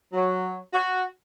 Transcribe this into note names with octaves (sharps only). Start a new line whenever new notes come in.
F#3
F#4